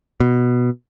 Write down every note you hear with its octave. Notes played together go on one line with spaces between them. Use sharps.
B2